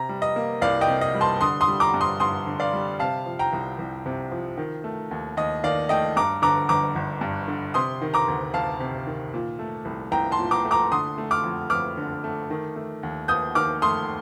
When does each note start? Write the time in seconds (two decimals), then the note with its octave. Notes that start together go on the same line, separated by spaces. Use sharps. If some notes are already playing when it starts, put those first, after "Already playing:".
Already playing: C3 A#5
0.09 G3
0.22 D#5
0.36 A#3
0.61 C2 D5 F5
0.81 D#5 G5
0.88 C3
1.01 D#5
1.15 G3
1.21 A5 C6
1.41 D3 C6 D#6
1.61 C6 D#6
1.68 G3
1.80 A#5 D6
1.94 G2
2.01 C6 D#6
2.20 G2 C6 D#6
2.47 D3
2.60 D5 F5
2.73 G3
2.99 C3 F5 A5
3.26 F3
3.39 G5 A#5
3.53 C2
3.79 C2
4.06 C3
4.31 F3
4.57 D#3
4.84 A3
5.11 D#2
5.37 D#2 D#5
5.64 D#3 D5 F5
5.89 A3 D#5 G5
6.16 G2 A#5 D6
6.42 D3 A#5 D6
6.69 G1 A#5 D6
6.95 G1
7.21 G2
7.48 D3
7.74 C3 C6 D#6
8.02 D#3
8.14 A#5 D6
8.28 D2
8.54 D2 F5 A5
8.80 C3
9.07 D#3
9.34 A#2
9.59 A3
9.85 C2
10.12 C2 G5 A#5
10.31 A5 C6
10.39 A#2
10.51 A#5 D6
10.65 A3
10.71 A#5 D6
10.91 D3 C6 D#6
11.18 A3
11.31 D6 F6
11.44 F2
11.70 F2 D6 F6
11.97 D3
12.24 A3
12.50 D#3
12.76 A3
13.03 D#2
13.28 D#2 D#6 G6
13.55 D#3 D6 F6
13.82 A3 C6 D#6